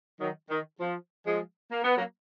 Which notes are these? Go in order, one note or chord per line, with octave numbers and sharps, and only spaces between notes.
D#3 F#3
D#3
F3
F3 G#3
A#3
B3
F#3 A#3